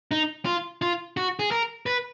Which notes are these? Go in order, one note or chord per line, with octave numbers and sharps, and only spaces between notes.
D#4
F4
F4
F#4
G#4
A#4
B4